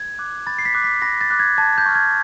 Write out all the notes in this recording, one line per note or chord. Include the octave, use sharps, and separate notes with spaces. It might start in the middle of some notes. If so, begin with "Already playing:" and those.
Already playing: G#6
D6 F#6
B5 A6
C7
B6
D6 F#6
B6
B5 A#6
A6
D6 F#6
G#6
A5 G#6
G6
C#6 F6
G#6